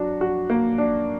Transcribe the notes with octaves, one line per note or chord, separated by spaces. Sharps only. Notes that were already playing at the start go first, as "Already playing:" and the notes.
Already playing: F#3 D4 F#4
F#4
A#3
D4